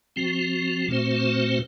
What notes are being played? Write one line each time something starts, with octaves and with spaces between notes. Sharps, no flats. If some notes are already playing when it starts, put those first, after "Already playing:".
F3 C4 F#4
A#2 A3 C4 F#4 C5